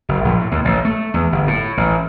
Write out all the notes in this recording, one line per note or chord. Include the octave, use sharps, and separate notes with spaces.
F#1
A#1
A2
D#2
A1
A3
E2
G1
A2
A1